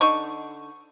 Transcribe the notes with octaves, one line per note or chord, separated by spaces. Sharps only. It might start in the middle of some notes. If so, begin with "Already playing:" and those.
D3 D#4 C#6